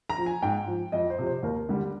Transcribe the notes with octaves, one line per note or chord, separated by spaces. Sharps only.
A#5
F3
G#5
G#2 G5
F3
F2 D#5
C5
C3 F3
C5
D#2 A#4
D3 G3